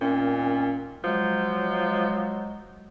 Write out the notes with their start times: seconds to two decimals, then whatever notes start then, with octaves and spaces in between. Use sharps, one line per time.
0.01 A#2 D#3 C4 C#4
1.04 F3 F#3 G#3